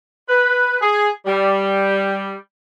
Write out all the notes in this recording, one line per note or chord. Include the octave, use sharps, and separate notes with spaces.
B4
G#4
G3